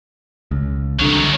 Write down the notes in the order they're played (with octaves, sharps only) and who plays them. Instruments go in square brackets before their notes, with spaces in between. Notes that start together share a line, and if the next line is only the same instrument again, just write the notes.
[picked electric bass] C#2
[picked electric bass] C2 D3 [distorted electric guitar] D#3 F#3